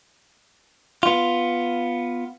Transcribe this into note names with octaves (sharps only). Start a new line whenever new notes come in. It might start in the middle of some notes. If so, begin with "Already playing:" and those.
B3 F4